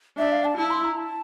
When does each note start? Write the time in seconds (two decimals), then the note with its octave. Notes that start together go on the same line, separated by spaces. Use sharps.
0.18 D4 E5
0.32 F5
0.45 A5
0.57 E4 A5
0.71 C6
0.84 A#5
0.97 A5